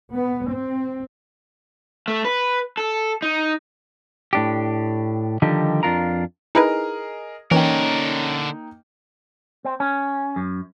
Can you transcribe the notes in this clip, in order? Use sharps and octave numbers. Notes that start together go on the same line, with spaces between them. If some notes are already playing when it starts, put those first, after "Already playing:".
B3
C4
A3
B4
A4
D#4
A2 D4 G4
D3 D#3 F3 G3 D#4 G4
F2 D4 F4 A#4 A#5
D#4 E4 G#4 A#4 B4 D#5
D3 E3 A#3 C#4 D#4 A#4 G5
C4
C#4
F#2